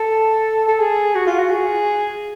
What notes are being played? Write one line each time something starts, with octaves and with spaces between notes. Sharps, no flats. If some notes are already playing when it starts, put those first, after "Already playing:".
Already playing: A4
A4
G#4
F#4
F4
F#4
G#4